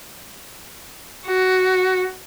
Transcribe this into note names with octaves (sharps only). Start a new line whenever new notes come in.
F#4